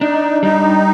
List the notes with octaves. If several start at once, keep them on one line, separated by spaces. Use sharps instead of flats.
D4 D#4
G3 D#4